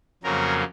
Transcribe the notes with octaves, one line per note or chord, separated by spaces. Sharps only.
F2 C#3 F#3 A#3 A#4